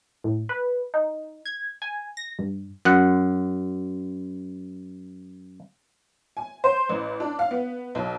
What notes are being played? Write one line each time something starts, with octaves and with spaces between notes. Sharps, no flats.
A2
B4
D#4
G#6
G#5
A#6
G2
F#2 F#5
G#5
C5
A1
D4
F5
B3
B1